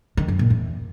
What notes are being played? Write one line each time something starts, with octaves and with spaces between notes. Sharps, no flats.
D#3
F#2
A#2
E2